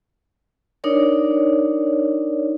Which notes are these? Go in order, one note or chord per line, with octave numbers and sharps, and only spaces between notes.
D4 D#4 A#4 C#5 D5